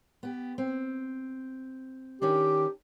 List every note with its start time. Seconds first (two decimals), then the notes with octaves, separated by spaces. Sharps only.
0.23 B3 G4
0.58 C4
2.22 D#3 C#4 D4 G4